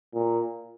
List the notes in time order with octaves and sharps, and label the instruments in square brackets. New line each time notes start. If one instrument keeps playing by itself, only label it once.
[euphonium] A#2